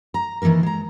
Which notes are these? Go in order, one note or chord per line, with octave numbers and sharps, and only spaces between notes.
A#5
D#3 E3 G#3 A#3 A#4
G#3 A#5